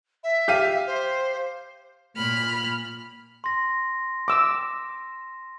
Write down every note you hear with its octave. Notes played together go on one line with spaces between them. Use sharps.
E5
G4 F5 D#7
C5
A#2 B5 F6
C6 A#6
D6 E6